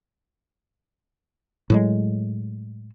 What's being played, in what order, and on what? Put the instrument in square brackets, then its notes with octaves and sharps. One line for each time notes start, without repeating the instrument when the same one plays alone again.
[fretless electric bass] A2 F#3 G#3